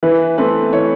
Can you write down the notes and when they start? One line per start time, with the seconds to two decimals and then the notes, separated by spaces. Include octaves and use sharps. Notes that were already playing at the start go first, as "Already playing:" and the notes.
0.03 E3 B4
0.38 A3 C4 B4
0.73 E3 C#5